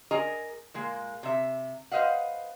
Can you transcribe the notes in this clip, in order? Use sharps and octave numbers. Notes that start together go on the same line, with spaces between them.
G#4 A#4 D#5 G#5 A#5
A#2 G#3 A#3
C3 E5
B4 C5 D#5 F5 F#5